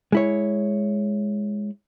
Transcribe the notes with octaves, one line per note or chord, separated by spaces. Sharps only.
G#3 E4 C#5